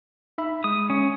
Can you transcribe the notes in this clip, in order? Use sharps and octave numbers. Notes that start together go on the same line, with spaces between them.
D#4 E5 B5
G#3 D#6
C#4